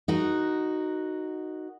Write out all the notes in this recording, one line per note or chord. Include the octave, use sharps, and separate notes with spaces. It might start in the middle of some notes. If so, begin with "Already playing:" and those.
D#4 F#4 A#4